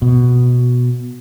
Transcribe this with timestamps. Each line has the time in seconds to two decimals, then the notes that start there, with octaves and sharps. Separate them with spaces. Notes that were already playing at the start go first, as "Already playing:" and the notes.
0.02 B2